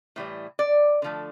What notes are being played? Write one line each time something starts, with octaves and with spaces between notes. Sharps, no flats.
A2 E3 G3
D5
D3 F3 A3